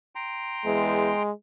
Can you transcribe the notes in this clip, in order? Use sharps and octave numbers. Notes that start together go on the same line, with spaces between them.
G5 A#5 C6
E2 G#3